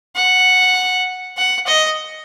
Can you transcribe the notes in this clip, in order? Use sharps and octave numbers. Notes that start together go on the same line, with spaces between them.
F#5
F#5
D#5